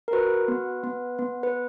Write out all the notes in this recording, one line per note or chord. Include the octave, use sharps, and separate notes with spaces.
A#4
F#4 B4
B3
B3
B3
B4